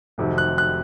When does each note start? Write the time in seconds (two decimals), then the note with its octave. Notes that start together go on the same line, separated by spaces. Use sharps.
0.18 F1 F2 C3 D#3 F#3
0.38 F#6
0.58 F#6